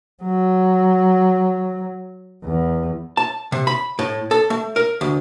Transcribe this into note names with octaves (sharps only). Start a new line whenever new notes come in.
F#3
E2
A5
C3
B5
A2
A4
A3
A#4
D2